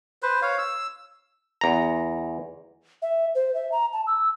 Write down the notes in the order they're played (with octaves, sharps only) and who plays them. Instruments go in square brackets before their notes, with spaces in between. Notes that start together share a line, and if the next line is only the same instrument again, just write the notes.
[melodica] B4 C5
C#5 F5
E6
[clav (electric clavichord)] E2 A#5
[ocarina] E5
C5
E5
A#5
A5
E6